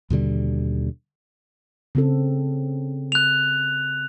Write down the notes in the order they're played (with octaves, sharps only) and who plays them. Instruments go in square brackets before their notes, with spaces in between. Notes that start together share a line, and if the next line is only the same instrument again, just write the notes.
[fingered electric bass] D#2 B2 D3 G3
[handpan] C#3 C4 A4
[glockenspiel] F#6 F7